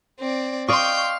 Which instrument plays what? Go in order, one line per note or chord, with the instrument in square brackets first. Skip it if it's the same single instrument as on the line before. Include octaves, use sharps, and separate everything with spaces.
[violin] C4 D5
[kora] D5 D#5 [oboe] F5 [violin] G5 G6 [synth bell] C6 C#6